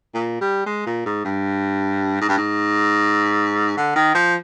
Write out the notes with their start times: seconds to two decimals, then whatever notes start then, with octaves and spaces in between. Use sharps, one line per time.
0.15 A#2
0.41 G3
0.66 G#3
0.86 A#2
1.06 G#2
1.25 G2
2.21 G#2
2.29 G2
2.38 G#2
3.77 D3
3.96 D#3
4.15 F3